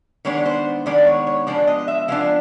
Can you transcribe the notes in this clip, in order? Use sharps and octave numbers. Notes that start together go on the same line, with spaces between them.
D#3 G#3 B3 D4 C#5
C5
D#3 G#3 B3 D4 D5
C#5
C#5
F3 G#3 B3 D4 D5
D#5
E5
F3 G#3 B3 D4 F5